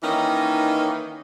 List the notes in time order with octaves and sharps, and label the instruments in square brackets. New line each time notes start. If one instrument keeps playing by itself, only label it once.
[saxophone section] D#3 E3 A#3 C#4 D#4